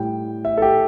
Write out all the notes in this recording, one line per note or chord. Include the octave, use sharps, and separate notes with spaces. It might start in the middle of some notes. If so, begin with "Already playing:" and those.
Already playing: A2 G3 G5
E5
A4
G4